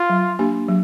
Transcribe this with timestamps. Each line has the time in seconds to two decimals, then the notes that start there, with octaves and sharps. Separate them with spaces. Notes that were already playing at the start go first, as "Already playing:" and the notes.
Already playing: F4
0.10 F#3
0.39 A#3 D4 G4
0.69 F#3